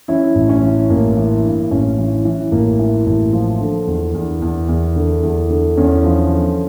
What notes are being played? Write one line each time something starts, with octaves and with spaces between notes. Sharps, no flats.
E3 C#4 E4
A1
C#4
E3
A1 A#3
E3
G2
A1 C#4
E3
E3
A1 A#3
E3
A1
F3
D3
E2
E2
E2
E2
D3
E2
D3
E2 C#4
F3
D3